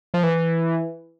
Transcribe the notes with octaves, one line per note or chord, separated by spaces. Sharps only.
F3
E3